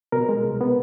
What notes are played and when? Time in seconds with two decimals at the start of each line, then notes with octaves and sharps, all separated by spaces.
0.12 B2 A#4
0.29 G#3
0.44 C2
0.61 B3